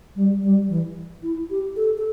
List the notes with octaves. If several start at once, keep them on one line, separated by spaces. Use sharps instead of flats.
G3
G3
E3
E4
G4
A4
A4